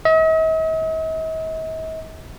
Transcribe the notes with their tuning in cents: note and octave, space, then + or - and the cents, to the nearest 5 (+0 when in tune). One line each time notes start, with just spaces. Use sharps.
D#5 +45